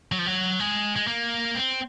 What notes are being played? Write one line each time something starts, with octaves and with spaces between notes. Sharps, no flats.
F#3
F3
F#3
G#3
G#3
A#3
C4